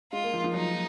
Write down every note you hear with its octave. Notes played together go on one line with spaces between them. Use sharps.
G#3 F4
A#3
F3
F3
F#3 D#4